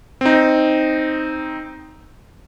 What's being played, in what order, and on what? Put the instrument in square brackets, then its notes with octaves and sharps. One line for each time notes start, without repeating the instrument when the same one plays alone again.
[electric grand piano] C4 D#4